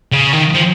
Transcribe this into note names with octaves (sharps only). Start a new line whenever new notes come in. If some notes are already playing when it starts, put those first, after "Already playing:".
C#3
D#3
F3